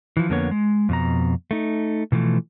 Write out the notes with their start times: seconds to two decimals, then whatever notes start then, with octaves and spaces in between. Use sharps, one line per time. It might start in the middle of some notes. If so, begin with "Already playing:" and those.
0.17 E3 F3
0.29 F2 D3 A#3 B3 C#5
0.51 G#3
0.89 F2 B2 A#5
1.51 A3 D#4
2.12 B2 E3 F3 A3